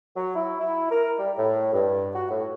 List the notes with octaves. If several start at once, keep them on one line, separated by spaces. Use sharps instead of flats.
F#3
E4
E4
A#4
G3
A2
G2
F#4
A2